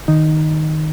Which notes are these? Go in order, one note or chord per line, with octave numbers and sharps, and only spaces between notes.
D#3 D#4